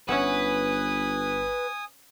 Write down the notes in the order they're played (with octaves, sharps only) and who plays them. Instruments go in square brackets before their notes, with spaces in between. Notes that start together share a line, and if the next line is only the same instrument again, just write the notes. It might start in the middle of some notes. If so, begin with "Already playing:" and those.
[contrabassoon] G1 [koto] C#4 E5 F#5 [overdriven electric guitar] B4 [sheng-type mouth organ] G#5 D#6